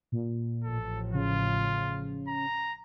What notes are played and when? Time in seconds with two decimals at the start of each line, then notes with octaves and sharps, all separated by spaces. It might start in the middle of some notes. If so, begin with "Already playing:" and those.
0.12 A#2
0.64 A1 A2 F3 A4
1.14 C#3 F4
2.28 A#5